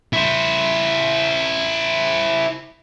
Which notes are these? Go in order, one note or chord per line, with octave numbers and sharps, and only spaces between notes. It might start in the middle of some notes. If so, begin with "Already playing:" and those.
E4 C5